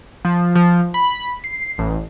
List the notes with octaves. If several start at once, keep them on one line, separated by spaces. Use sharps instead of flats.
F3
F3
B5
C7
A1